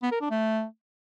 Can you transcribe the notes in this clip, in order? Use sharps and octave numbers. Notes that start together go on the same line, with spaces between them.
B3
A#4
D4
A3